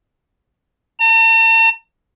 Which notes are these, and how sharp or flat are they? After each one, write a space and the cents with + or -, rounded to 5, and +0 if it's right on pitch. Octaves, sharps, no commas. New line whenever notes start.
A5 +45